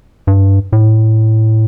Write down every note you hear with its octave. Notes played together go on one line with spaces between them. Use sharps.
G2
A2